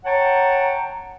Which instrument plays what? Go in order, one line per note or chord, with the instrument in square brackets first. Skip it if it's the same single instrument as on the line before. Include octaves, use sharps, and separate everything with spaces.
[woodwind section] C#5 F#5 G5 A5 A#5